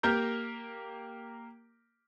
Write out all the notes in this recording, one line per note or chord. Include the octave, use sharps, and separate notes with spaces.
A#3 G4 A#4 A#5 G6